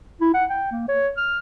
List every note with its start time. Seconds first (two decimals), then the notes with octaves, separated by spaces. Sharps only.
0.21 E4
0.34 F#5
0.50 G5
0.71 A#3
0.88 C#5
1.17 F6